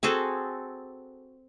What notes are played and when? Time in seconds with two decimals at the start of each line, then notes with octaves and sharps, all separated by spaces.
0.03 C4 F#4 G#4 A4